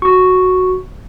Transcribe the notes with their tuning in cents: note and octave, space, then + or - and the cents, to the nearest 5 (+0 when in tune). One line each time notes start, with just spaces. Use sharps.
F#4 +0 C#6 +0